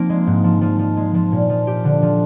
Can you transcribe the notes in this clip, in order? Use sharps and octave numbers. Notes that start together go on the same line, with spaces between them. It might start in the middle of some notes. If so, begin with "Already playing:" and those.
Already playing: F3 A#3 C4 D#4
G#3
G#2
F3
F3
F3
G#3
F3
A#2
F3
G4
D3
F3